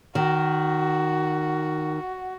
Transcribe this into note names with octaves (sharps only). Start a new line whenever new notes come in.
D#3 F#4